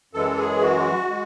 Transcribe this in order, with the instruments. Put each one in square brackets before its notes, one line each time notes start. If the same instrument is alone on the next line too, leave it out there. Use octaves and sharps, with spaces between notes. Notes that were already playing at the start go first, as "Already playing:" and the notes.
[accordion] F#2 E3 G#3 A4
G#4
F#4
G#3